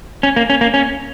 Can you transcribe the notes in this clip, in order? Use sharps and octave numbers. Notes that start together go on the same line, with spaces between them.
C#4
A#3
C#4
A#3
C#4